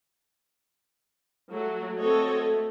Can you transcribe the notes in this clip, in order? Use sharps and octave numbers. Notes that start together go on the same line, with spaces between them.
F#3 A3 F#4
A3 C4 F#4 A4 C#5 D#5
A3